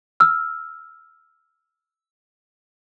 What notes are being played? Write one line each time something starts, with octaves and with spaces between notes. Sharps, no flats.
E6 F6